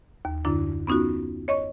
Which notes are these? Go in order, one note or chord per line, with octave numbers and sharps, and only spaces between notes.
D#2
F#2 D3 D4 E4
B3 C#4 D#4 F4 F#4
C#5 D#5 C#6